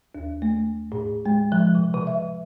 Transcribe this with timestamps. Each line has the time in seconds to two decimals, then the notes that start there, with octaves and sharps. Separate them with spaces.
0.15 D#2
0.42 A3
0.92 A2
1.26 G#3
1.52 F3
1.75 C3
1.94 C3
2.07 E5